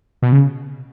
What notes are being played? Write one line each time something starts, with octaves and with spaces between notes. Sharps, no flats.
B2
C#3